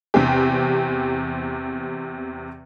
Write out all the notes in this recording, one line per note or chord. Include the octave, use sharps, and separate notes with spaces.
E2 C3 C4 G4